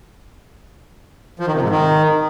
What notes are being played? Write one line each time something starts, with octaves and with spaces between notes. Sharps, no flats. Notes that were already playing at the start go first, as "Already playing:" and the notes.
F3
D#3
C3
G#2
D#3